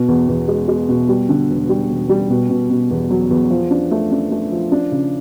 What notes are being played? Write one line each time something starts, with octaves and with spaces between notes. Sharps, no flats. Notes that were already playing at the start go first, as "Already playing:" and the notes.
Already playing: B2
E2
E2
G#3
G#3
B2
G3
D3
E1
G3
E1
G3
B2
B2
B2
E2
F#3
E2
F3
D4
A3
D4
A3
F3
D4
C#3